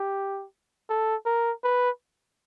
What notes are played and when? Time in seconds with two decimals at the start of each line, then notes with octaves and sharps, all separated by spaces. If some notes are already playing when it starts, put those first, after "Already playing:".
Already playing: G4
0.90 A4
1.26 A#4
1.64 B4